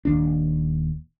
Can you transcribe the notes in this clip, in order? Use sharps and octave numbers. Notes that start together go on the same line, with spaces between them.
D#1 D#2 D4